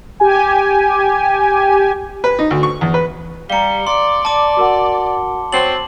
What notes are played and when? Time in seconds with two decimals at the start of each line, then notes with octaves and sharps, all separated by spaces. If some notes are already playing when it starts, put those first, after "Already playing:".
0.20 G4 G#5
2.24 B4
2.39 D#4
2.51 D2
2.63 C#6
2.81 E2
2.94 B4
3.50 G3 F5 A#5 C#7 G7
3.87 D5 C6
4.25 A5 D6
4.57 F#4 A#4 F#5
5.52 F#3 C4 A6 C7 F#7